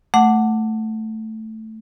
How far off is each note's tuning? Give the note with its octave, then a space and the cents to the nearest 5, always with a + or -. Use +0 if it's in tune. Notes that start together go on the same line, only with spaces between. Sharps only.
A3 +0 F#5 +0 D6 +0